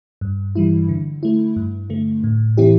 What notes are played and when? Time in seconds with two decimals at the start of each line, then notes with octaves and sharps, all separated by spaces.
0.21 G2
0.55 E3 G3 E4
0.89 D3
1.23 A3 E4
1.56 G2
1.90 D3 A3
2.24 A2
2.57 E3 C4 E4 G4